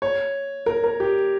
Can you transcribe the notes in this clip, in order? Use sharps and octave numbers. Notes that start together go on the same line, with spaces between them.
C#5
A#4
A#4
G4